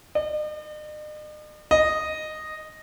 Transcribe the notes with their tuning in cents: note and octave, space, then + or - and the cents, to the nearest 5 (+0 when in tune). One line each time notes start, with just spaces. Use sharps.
D#5 -45
D#5 -5